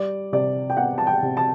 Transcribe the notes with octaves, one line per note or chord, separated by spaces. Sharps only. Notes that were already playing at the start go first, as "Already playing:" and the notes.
Already playing: G3 D5
C3 D5
G5
B3 F#5
A5
G5
C3
A5